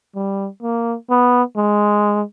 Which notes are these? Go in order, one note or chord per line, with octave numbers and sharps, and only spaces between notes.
G3
A#3
B3
G#3